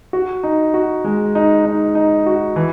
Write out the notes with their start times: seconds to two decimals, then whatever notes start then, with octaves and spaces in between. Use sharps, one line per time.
0.13 F#4
0.43 D#4
0.74 F#4
1.04 G#3
1.35 D#4
1.65 D#4
1.95 D#4
2.26 F#4
2.56 E3